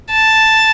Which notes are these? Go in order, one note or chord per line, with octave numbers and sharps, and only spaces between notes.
A5